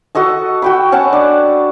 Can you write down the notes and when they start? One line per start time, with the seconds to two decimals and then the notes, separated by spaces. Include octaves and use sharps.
0.15 F#4 A4 D#5 A5
0.62 F#4 G5 B5
0.92 C#4 F#5 A5
1.13 D4